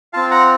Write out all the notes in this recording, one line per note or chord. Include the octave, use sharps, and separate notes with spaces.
C4 F4 F5 A5
F#5 A#5